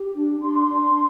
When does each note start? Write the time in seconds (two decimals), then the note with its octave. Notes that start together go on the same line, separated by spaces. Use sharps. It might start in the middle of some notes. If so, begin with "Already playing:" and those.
Already playing: G4
0.14 D4
0.40 D4 C6
0.67 D4
0.94 D4